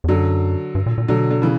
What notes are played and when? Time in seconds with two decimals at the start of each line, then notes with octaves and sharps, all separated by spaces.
0.04 E2
0.08 F#2 D3 F#3
0.75 G2
0.86 A#2
0.98 A#2
1.08 B2 D3 F#3
1.30 D3
1.42 C#3 E3